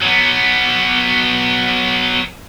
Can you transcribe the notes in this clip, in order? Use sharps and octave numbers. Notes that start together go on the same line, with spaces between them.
F#3 B3